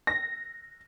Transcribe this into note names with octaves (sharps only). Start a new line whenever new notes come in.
A#6